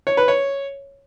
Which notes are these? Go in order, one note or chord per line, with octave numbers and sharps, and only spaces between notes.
C#5
B4
C#5